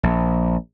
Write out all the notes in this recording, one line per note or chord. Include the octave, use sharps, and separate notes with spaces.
A#1